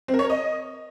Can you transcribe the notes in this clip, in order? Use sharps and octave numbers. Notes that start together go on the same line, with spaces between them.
C4
A#4
C#5
A#4
D#5